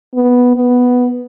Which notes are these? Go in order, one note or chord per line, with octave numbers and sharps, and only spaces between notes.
B3
B3